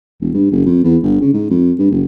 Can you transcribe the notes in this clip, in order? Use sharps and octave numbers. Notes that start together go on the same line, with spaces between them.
E1
G2
F#1
F2
E2
G1
C#3
G#2
F2
G2
F#1